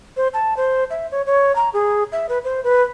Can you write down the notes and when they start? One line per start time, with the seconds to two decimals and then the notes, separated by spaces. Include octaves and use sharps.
0.17 C5
0.34 A5
0.57 C5
0.90 E5
1.11 C#5
1.26 C#5
1.56 A#5
1.74 G#4
2.12 E5
2.29 B4
2.44 C5
2.64 B4